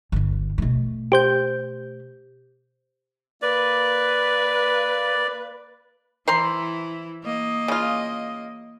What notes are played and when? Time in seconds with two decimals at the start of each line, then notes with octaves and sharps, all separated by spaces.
0.12 G1 C#2
0.58 B2 A3
1.12 G4 C5 G6
3.42 A#3 B4 D5
6.28 E3 E4 C5 A#5 C6
7.24 A#3 D#5
7.68 C#3 F4